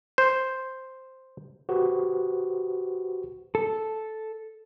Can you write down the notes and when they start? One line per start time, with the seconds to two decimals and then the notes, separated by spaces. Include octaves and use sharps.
0.18 C5
1.69 F#4 G4 B4 C5
3.55 A4